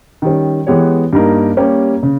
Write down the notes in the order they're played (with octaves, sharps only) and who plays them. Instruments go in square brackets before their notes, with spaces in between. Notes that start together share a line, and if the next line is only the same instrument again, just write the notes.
[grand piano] D#3 G3 C#4
E3 G#3 B3 G4 C#5
G2 G3 A#3 D#4 A#4
G3 A#3 C#4 G4
C#3